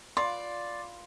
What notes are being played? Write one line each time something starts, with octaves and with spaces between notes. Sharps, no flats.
F4 B4 D5 C6